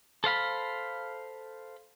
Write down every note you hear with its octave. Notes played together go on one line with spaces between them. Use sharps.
A4 C5 F5 B5